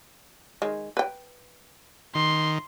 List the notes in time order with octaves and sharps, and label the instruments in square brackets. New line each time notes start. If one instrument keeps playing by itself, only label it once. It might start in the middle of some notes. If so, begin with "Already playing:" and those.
[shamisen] D#3 G#3
B4 G5
[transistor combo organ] D#3 [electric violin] C6